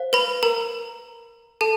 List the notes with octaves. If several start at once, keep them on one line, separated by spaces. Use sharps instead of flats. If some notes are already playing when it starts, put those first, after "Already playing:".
Already playing: C5 F5
B4 B5
A#4 A#5
A4 A5